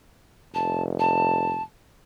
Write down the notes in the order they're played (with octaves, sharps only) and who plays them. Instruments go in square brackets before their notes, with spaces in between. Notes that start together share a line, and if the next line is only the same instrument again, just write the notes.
[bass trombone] F1 [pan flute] A5
[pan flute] A5